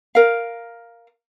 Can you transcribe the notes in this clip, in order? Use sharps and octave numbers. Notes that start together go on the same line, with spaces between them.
A#4 F5